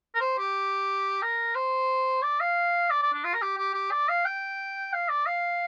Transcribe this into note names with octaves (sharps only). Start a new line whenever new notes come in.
A#4
C5
G4
A#4
C5
D5
F5
D5
D5
D4
F4
A#4
G4
G4
G4
D5
F5
G5
F5
D5
F5